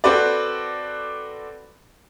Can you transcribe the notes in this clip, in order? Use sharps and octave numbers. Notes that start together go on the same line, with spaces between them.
C4 F#4 A4 B4 D5